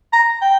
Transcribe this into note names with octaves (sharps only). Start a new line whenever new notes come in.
A#5
G5